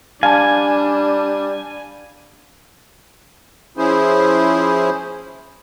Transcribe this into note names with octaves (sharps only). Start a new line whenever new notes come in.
G3 D4 F5 G#5 A5
F3 C#4 E4 G#4 C5